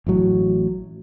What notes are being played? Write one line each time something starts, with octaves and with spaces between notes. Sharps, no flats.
A1 A2 F#3